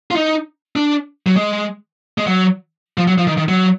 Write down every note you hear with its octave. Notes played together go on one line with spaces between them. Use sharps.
F4
D#4
D4
F#3
G#3
G#3
F#3
F3
F#3
F3
D#3
D#3
F#3